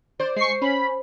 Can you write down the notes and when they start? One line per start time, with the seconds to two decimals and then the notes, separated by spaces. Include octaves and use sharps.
0.20 C5 D5
0.36 G#3 C#6 C7
0.62 C#4 B5